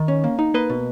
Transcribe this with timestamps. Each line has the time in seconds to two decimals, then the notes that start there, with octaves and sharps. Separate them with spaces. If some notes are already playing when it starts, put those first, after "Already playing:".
Already playing: D#3
0.08 C#4
0.24 A#3
0.39 D#4
0.54 A#3 B4 D#5
0.70 B2